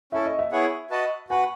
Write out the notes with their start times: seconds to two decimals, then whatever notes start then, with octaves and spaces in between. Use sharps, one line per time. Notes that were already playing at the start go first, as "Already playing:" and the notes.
0.12 C#4 E4 A4 E5
0.26 D#5
0.39 E5
0.52 B3 E4 G#4 C#5 F#5
0.90 F#4 B4 D#5 F#5 A5
1.29 F#4 B4 F#5 G#5